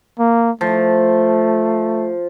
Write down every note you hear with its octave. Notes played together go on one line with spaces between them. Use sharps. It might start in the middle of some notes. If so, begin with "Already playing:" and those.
A#3
F3 A3